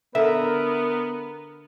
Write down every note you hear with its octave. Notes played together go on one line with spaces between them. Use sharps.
D3 B3 A#4 E5